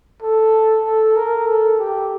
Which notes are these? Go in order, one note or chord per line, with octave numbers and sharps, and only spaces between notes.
A4
A4
A#4
A4
G4